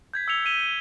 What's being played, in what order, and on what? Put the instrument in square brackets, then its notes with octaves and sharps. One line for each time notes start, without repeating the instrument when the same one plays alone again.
[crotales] G6 G#6 B6
E6 B6 C#7 F7 G7
E6 B6 D#7 E7 G7
G7